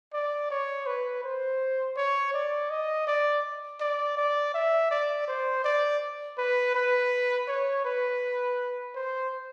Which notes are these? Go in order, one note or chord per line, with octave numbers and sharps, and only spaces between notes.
D5
C#5
B4
C5
C#5
D5
D#5
D5
D5
D5
E5
D5
C5
D5
B4
B4
C#5
B4
C5